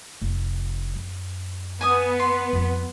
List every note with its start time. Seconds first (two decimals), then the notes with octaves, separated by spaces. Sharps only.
0.21 F1
0.96 F#2
1.81 B3 B4 G#5 D#6
2.20 C6
2.53 F2 G3